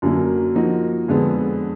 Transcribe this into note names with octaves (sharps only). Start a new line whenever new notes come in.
F#2 D3 F#3 A#3
F3 A#3 D#4 F#4
F2 D3 G#3 B3